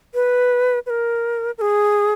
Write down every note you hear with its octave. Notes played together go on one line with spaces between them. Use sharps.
B4
B4
A#4
A#4
G#4